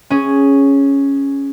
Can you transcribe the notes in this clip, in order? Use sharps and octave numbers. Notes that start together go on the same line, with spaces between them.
C#4 G#4